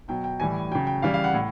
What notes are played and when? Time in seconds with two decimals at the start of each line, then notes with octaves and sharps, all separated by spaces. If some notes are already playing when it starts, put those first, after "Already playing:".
0.08 B2 F#3 G5
0.24 G5
0.40 A2 E3 G3 G#5
0.71 C#3 F#3 G5
0.87 G5
1.02 C#3 E3 G3 F5
1.14 F5
1.24 F#5
1.34 A2